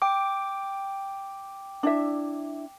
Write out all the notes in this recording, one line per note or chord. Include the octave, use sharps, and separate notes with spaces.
G5 D6
D4 E4 E5